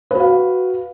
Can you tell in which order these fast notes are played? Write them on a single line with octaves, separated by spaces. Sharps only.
B4 F#4 F5